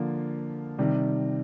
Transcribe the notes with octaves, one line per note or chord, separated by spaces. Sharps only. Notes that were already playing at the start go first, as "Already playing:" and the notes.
Already playing: D3 F3 A#3 F4
C3 D#3 G3